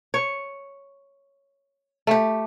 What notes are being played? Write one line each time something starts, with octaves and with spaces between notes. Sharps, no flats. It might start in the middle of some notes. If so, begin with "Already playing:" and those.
C#5
A3 G4